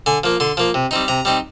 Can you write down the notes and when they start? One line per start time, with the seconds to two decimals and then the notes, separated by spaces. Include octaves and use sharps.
0.06 D3 G#5
0.24 F3 A#3
0.40 D3 C6
0.57 F3 A#3
0.74 C3
0.91 G3 C4 D#4
1.08 C3 A#5
1.25 G3 C4 D#4